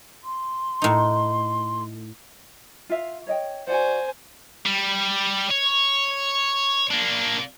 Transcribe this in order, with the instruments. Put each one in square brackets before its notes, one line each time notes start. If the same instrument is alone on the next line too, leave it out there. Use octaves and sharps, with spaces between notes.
[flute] C6
[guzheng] A2 D#4
[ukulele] F4 E5 F5
C#5 D#5 G5
[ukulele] F#4 D5 F#5 [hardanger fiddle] C5 G#5
[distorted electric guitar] G3
C#5
A#3 D4